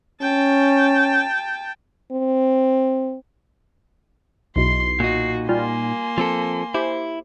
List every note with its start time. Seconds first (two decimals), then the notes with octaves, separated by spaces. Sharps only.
0.22 C#4 G5 A5
2.12 C4
4.56 B1 E2 B2 C6 C7
5.00 A#2 D#4 F#4
5.49 G3 A#3 F4 G#5 C6
6.18 F3 C4 A4
6.74 E4 G4 C5